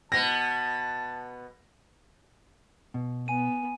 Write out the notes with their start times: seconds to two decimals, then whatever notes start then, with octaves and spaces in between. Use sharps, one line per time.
0.12 B2 B3 A5 A#6
2.94 B2
3.28 B3 G#5 D#7